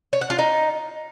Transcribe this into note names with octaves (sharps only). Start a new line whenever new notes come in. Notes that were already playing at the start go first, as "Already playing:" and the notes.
C#5
F#5
F4
D#4